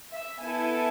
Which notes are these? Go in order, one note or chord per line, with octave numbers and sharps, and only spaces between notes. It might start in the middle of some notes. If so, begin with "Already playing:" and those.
E5
B3 E4 A4 G#5